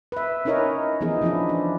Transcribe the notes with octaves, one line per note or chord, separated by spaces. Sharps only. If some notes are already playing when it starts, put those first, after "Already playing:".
B4 E5
C#4 D#4 E4 A#4 C#5 D#5
E3 F3 B3 D#4 G#4
E3 F3 C#4 D4 E4
D4